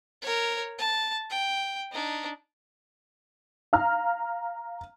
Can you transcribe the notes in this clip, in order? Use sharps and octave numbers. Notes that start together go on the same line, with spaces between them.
A#4 C#5
A5
G5
D4 D#4
F5 A#5 F6